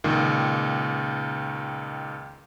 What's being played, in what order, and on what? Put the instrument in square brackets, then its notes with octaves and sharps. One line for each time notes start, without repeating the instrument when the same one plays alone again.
[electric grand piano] C#2 A#2 D#3